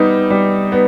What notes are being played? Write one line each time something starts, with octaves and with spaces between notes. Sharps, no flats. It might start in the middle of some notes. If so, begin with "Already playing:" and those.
Already playing: G3 B3 D#4
G3
B3